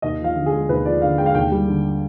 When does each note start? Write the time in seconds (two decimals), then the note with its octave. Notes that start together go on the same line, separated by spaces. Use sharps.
0.02 D#2 D#5
0.20 F3 F5
0.36 D3
0.46 G#4
0.52 G#3
0.69 D#2 B4
0.85 F3 D5
1.02 D3 F5
1.18 G#3 G5
1.26 F5
1.35 D#2 G5
1.52 G3
1.68 D3